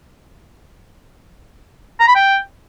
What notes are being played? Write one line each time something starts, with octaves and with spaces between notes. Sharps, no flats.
A#5
B5
G5